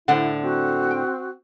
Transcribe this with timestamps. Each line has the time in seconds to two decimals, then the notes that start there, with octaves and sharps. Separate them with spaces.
0.08 A2 D3 E4 C5 F#5
0.43 C4 F#4
0.91 G5